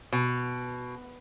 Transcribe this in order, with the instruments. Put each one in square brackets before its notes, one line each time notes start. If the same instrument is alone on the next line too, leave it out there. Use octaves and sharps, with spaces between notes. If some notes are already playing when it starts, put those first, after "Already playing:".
[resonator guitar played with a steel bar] B2